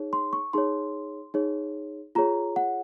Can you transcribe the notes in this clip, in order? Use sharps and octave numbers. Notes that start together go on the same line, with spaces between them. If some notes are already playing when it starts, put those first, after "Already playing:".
Already playing: D#4 G#4 C#5
C6
C#6
D#4 G#4 C#5 C6
D#4 G#4 C#5
F4 G#4 C#5 A#5
F#5